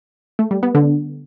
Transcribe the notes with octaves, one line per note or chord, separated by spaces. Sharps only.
A3
G3
B3
D3